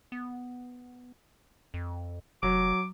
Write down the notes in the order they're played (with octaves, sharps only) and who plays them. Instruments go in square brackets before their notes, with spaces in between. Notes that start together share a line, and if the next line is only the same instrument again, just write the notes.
[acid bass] B3
F2
[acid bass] F1 [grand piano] F#3 [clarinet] D6